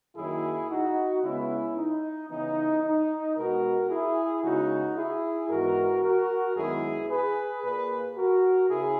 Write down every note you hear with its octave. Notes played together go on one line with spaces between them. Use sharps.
F#2 D#3 F#3 A#3 E4 G#4
D#4 F#4
C#3 G#3 B3 C#4 E4
D#4
C#3 E3 B3 D#4
D#4
B2 G#3 B3 F#4 A#4
E4 G#4
C#3 G#3 B3 D#4 F#4
E4 G#4
G#2 E3 B3 F#4 A#4
F#4 A#4
F#2 D#3 G#3 B3 E4 G#4
G#4 B4
A#2 A#3 G#4 B4
F#4 A#4
C#3 E4 G#4